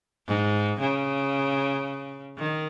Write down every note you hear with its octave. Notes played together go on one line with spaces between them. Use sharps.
G#2
C#3
D#3